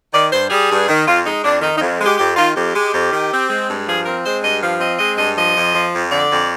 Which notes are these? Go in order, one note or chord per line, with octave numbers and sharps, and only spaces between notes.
D#3 D5
G2 C5
G3 G#4
G2
D#3
F2 F4
G#3 D#4
F2 D4
D#3 D#4
D#4
F2
G#3
G4
F2 G4
D#3 F4
F2 G4
G#3
F2
D#3
C4
G#3
G2
F3 G#4
C4 A#4
G#3 C5
G2 D#5
F3 F5
C4 D#5
G#3 D#5
G2 D#5
F3 D#5
F2
F3
F2
D3 D5
F2